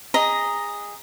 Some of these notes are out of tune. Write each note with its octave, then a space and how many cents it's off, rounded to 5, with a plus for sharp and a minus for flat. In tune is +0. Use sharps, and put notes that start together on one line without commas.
G#4 -25 D#5 +0 A#5 +0